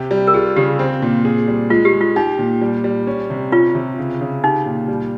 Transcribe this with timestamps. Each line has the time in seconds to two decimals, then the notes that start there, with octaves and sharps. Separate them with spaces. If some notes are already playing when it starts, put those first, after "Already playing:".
Already playing: C3 G4
0.11 G3
0.27 A#4
0.34 F4 G#4
0.56 C#3 G4
0.79 C4
1.02 A#2
1.25 G#4
1.48 G3
1.70 G#3 F4
1.85 G4
1.93 G#3
2.01 F4
2.16 D#4 G4
2.39 A#2
2.62 G3
2.84 G3
3.07 C#4
3.30 C3
3.52 C#4 F4
3.75 C3
3.98 C#3
4.21 C#3
4.44 D#4 G4
4.66 A#2
4.88 G3